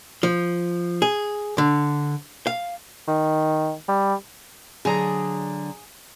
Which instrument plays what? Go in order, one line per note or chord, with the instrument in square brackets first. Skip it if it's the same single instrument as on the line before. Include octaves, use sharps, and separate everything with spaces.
[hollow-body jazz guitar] F3
G#4
D3
F5
[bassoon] D#3
G3
[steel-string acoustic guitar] D3 F#3 A#5 [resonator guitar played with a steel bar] G#4